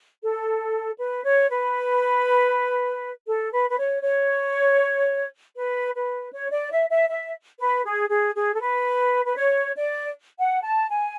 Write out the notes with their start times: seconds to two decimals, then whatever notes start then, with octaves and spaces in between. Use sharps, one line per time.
0.22 A4
0.98 B4
1.24 C#5
1.49 B4
3.27 A4
3.52 B4
3.69 B4
3.78 C#5
4.03 C#5
5.56 B4
5.94 B4
6.32 C#5
6.51 D5
6.71 E5
6.90 E5
7.09 E5
7.59 B4
7.84 G#4
8.09 G#4
8.35 G#4
8.53 A4
8.61 B4
9.25 B4
9.36 C#5
9.75 D5
10.39 F#5
10.64 A5
10.89 G#5